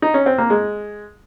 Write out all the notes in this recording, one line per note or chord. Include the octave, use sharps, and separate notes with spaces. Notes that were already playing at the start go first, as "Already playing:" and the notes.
D#4
C#4
C4
A#3
G#3